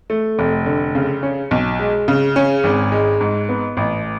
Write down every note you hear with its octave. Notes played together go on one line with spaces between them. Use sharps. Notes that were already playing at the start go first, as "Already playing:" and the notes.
A3
F1
D3
C#3
C#4
B1
G#3
C#3
C#4
G#1
G#3
G#2
B3
A1